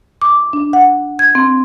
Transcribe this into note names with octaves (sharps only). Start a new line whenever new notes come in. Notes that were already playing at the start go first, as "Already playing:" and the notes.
D6
D4
F#5
G#6
C4